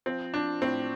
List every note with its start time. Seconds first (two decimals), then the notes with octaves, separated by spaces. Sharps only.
0.06 F3 C4
0.34 F3 D4
0.62 A2 C4